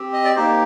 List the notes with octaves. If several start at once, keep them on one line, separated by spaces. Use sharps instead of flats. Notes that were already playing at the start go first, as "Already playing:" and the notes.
Already playing: C4 G4
D#5
D5
A#3 D#4 G4 C5